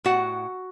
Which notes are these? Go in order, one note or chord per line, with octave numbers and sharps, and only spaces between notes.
A2 F#4 F#5